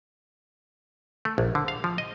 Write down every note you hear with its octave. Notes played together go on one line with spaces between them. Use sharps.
A3
A#1
D3
F5
F3
D#5